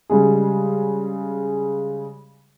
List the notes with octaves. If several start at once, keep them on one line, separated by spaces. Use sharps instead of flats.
C#3 G3 G#3 G#4